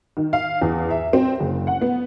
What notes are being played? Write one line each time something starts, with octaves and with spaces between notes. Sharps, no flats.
D#3
F5
E2
E5
C4
F#1
F#5
B3